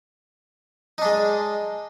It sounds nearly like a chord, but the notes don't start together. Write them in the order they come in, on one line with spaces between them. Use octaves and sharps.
D#4 D4 G#3